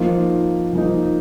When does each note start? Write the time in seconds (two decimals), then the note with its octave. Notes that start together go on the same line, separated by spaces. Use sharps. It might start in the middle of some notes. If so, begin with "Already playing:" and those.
Already playing: F3 A#3 D#4
0.73 F3 A#3 D#4